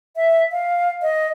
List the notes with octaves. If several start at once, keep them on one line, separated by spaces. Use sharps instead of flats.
E5
F5
D#5